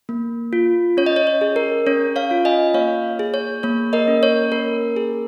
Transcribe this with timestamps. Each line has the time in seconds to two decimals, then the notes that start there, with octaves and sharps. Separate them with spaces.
0.09 A#3
0.53 F4
0.97 C#4 C#5
1.06 D#5
1.16 C#5
1.27 C#5
1.41 G#4
1.56 A#4
1.87 C#4 C#5
2.16 C#5 F5
2.31 F4
2.45 D#5 G#5
2.74 A#3 C#5 F5
3.19 G#4
3.34 C#5
3.63 A#3 C#5
3.93 A#4 D#5
4.08 C#4
4.23 C#5
4.52 A#3 A#4
4.97 G#4